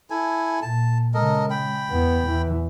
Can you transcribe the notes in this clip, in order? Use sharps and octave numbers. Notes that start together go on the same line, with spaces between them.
E4 A4 G#5
A#2 A5
C#3 G#3 A4 A#4 D#5
G5 B5
E2 B3
E2 E3